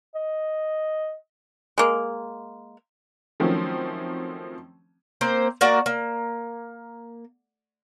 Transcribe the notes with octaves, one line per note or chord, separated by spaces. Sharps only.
D#5
G#3 A#3
D#3 F3 F#3 A3 C4 C#4
A#3 C4 C5
A#3 F#4 D5
A#3